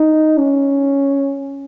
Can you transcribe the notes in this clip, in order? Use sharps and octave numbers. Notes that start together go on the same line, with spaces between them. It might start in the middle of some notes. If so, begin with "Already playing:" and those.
Already playing: D#4
C#4